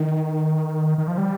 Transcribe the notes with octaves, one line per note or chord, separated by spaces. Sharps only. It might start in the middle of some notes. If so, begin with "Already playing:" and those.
Already playing: D#3
D#3
F3
G3